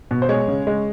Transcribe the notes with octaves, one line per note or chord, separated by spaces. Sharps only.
B2
C5
G#3 C#5
C#3
G#3